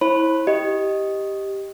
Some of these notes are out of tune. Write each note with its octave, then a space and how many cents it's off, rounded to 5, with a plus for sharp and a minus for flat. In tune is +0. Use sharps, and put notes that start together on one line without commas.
E4 -15 C5 +40 B5 +0
G4 +0 D#5 +0